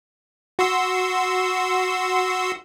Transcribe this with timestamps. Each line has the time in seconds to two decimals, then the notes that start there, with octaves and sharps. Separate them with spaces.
0.59 F#4 C6 E6